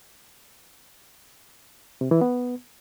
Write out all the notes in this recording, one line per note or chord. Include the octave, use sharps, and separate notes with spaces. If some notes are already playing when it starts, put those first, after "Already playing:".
C3
E3
B3